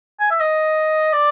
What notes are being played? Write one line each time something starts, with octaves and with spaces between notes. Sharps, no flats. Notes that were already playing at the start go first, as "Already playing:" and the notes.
G#5
E5
D#5
D5